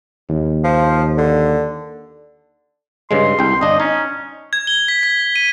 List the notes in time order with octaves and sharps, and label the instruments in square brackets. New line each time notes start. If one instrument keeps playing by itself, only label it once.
[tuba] D#2
[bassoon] F3
D3
[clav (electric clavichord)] G2 C#3 G#3 [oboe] C6
[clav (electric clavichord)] C2 G5
[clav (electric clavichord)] G1 D4 [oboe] D#5
[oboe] C#4 [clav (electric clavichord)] D#4
[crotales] G#6
G7
B6
B6
D#7